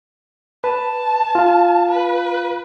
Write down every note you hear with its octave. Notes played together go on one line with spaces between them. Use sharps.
B4 A5
F4 F5
B4